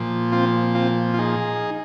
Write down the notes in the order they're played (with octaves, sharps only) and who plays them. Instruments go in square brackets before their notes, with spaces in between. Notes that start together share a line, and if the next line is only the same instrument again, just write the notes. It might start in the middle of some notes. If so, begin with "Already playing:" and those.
Already playing: [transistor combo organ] A#2 F3
C4 F4
C4 F4
F4
D#4 G#4